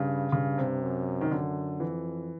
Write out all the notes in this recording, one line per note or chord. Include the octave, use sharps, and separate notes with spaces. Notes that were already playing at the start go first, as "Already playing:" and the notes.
Already playing: G2 C#3
G2 C#3
C3
F#2
D#3
F#2 D3
F2 E3